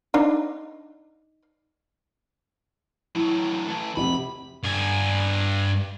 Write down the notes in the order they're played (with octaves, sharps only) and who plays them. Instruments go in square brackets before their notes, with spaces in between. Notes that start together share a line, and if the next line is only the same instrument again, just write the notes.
[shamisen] D4 D#4
[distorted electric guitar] A2 F#3 [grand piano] E3
[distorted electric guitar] E3 A3
[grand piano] F1 C3 [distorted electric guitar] B5
[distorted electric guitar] G2 G#5